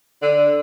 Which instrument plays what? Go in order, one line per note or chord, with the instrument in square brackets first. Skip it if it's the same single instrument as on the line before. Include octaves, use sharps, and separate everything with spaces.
[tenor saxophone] D3